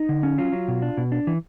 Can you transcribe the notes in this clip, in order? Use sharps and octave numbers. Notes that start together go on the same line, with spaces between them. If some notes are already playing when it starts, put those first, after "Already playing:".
Already playing: D#4
D3
C#4
F#3 F4
F#3
B2
D4
B2
D4
E3